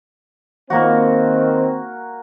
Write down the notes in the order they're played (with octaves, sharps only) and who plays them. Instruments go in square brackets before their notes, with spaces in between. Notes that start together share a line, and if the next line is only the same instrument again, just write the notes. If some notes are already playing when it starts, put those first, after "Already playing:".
[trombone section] D#3 C4 [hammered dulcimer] A#3 F#4